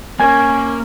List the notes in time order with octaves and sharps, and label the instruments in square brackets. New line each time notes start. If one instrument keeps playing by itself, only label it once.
[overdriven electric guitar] A#3 [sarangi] C#4 [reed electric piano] G#5 G#6